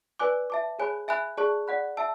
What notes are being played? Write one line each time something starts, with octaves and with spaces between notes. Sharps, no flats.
B4 D5 G#5 D6 F#6
E5 A5 D6
G#4 C#5 G#5 B5 F#6
E5 G#5 B5 F#6
G#4 D5 A5 C#6 F#6
D5 F#5 B5 F#6
E5 A5 E6